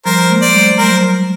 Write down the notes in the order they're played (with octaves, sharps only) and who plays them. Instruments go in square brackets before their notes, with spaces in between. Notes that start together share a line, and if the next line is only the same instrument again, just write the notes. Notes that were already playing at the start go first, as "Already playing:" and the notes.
[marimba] F3 G3 [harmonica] A#4 C5
[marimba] G#3 A#3
[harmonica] C5 D5
[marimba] G3 A3
[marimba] F#3 G#3 [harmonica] A#4 C5